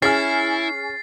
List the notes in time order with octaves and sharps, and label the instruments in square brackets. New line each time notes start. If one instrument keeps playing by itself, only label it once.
[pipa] C#4 [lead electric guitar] E4 [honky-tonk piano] G#4 G#5 F6 [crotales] A6 C7